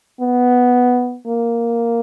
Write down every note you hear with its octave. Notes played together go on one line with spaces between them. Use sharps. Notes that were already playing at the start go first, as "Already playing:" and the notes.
B3
A#3